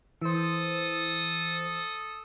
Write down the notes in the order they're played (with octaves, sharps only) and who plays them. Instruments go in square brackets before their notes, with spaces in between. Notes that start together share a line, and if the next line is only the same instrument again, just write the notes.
[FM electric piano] E3 C5 [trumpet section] A4 D#6